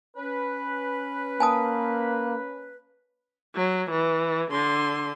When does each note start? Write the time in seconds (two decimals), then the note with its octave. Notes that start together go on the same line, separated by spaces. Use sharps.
0.17 C#4 B4
1.40 A#3 G#5 A5 D#6
3.56 F#3
3.91 E3
4.51 D3 C6